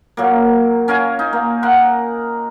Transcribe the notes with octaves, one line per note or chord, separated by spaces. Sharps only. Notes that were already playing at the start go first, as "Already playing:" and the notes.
A#2 F#3 A#3
C#4 A#4 F5 G#5
D#4
A#3
A#4 F#5 C6